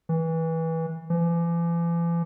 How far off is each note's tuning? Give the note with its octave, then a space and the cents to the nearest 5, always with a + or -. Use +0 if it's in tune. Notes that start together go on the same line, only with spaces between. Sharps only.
E3 -20
E3 +45